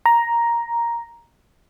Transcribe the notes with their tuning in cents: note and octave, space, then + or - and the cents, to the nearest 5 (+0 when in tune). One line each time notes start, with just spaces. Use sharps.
A#5 +5